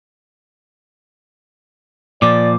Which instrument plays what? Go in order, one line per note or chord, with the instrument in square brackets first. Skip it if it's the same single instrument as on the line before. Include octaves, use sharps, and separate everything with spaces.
[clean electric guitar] A#2 F3 [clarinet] D5 [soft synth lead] D6